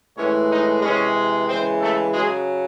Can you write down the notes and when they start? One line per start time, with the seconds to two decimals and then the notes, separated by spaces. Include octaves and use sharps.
0.16 A2 E3 G#3 C#4 C#5
0.49 D#4 D#5
0.82 C3 E3 G#3 C#4 C#5
1.48 C#3 E3 G#3 C4 C5
1.81 A3 A4
2.14 C#3 F#3 G#3 G#4